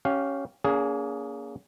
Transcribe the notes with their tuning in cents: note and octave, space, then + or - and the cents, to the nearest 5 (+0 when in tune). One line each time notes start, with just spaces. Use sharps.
C#4 +0 G4 -20 F5 +5
A#3 +5 C#4 +45 G#4 +0